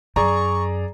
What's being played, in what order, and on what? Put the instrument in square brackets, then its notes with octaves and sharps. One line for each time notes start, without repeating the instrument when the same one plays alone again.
[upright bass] F#2 [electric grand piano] G#4 D5 A#5 [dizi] C#6